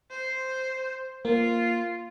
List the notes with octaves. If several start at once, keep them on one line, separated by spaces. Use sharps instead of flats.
C5
A#3 F4